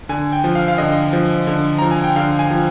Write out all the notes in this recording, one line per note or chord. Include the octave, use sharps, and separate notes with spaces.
D3 G#5
G5
F3
F5
F5
D3 D#5
F3
D3
F3 A#5
G#5
G5
D3 F5
G#5
F3